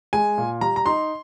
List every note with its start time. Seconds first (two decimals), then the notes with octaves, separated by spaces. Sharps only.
0.13 G#3 G#5
0.38 A#2
0.61 G3 A#5
0.76 A#5
0.86 D#4 C6